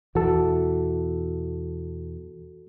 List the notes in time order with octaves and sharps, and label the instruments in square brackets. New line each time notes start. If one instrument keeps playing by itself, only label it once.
[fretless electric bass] E2 B2 E3 [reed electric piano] F#4 A4